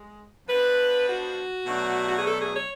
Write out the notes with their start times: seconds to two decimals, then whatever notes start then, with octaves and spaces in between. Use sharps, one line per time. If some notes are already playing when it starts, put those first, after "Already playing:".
Already playing: G#3
0.48 F3 B3 D4 B4
1.07 F#4
1.66 B2 F#3 A3 D4
2.06 F#4
2.15 G#4
2.25 A4
2.39 G#4
2.54 C#5